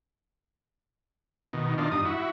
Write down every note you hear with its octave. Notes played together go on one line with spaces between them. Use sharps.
B2 D#3
D#3 D4 F4
G2 D#4 D#6
E4 F#4